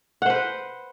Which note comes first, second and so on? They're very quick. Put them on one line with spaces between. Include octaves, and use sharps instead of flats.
F#5 C5 B4